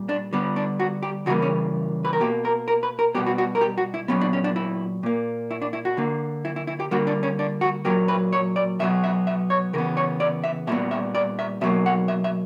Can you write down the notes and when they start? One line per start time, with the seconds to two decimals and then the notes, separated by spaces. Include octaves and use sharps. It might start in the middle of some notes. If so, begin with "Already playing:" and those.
Already playing: A#2 G3
0.09 D4
0.33 D3 G3 B3
0.56 D4
0.80 F#4
1.03 G4
1.26 C#3 E3 G3 A#3 F#4
1.42 C#4
2.05 B4
2.13 A#4
2.20 B2 A#3 G4
2.45 A#4
2.68 A#4
2.83 B4
2.99 A#4
3.15 B2 G3 B3 G4
3.26 F#4
3.38 F#4
3.55 A#4
3.61 G4
3.78 F#4
3.94 E4
4.08 A#2 F#3 B3 C#4
4.21 D4
4.33 C#4
4.44 D4
4.56 E4
5.03 A#2 A#3
5.51 E4
5.62 D4
5.73 E4
5.85 F#4
5.97 D3 A#3
6.45 E4
6.56 E4
6.67 E4
6.80 G4
6.91 D3 G3 A#3 F#4
7.07 D4
7.23 C#4
7.39 D4
7.61 F#4
7.85 A#2 F#3 A#3 G4
8.08 B4
8.32 C#5
8.56 D5
8.79 B2 F#3 B3 E5
9.04 E5
9.27 E5
9.50 C#5
9.73 C#3 E3 B3 A#4
9.97 C#5
10.20 D5
10.44 E5
10.67 A#2 G3 B3 E5
10.91 E5
11.15 D5
11.39 E5
11.61 B2 F#3 A#3 E5
11.86 F#5
12.08 E5
12.24 E5